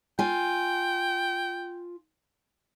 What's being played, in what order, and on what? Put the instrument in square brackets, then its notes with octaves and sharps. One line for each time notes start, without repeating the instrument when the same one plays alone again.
[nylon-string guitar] F4 G#5 [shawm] G5